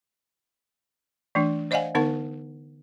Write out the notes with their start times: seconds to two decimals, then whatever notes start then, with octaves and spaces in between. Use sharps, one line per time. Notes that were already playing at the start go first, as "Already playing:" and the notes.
1.35 E3 A3 D4
1.71 C5 D5 D#5 F5 F#5 G#5
1.95 D3 B3 D#4 A#4 F#5